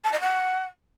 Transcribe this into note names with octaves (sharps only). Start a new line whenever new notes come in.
A5
D#5
F#5